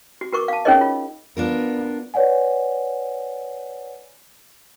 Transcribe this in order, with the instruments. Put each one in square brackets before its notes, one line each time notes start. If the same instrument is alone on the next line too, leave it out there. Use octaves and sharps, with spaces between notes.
[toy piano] F#4
F#4 A#4 C#6 D6
F5 A5
C#4 D#4 G#4 A#4 C#5 D#5
F4
[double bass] B3 [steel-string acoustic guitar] D4 F4 A#4
[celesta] B4 C#5 D5 F#5 G#5